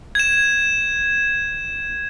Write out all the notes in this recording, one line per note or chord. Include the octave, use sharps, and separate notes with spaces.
G#6 E7